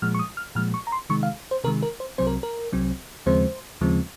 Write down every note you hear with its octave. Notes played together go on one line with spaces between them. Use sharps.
A#2 F3 G#3 F6
C#6
D#6
F6
A#2 F3 G#3 F6
C#6
A#5
C6
C3 D#3 G#3 C#6
F5
C5
C3 D#3 G#3 A#4
A#4
C5
C2 C3 F#3 C4 C5
A#4
A#4
C2 C3 F#3 C4
D#2 C#3 F3 G#3 C4 C5
D#2 C#3 F3 G#3 C4